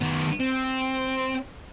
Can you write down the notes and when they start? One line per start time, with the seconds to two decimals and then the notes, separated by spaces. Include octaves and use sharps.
0.01 D#3 B3
0.40 C4